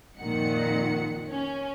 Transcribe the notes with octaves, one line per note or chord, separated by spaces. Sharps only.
F2 A#2 D#3 F#5 C#7
C#4